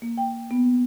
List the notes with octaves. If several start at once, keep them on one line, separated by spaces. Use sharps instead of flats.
A#3
G5
B3